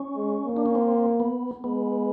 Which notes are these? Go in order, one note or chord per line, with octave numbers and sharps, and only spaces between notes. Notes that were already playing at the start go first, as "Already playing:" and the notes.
Already playing: C#4
G#3
A#3
D4
C#4
C4
B3
G#3 B3